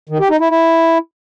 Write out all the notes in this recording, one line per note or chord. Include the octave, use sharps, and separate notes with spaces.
D#3
G4
D#4
E4
E4